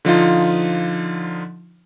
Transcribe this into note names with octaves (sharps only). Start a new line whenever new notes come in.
D3 F3 D#4 F4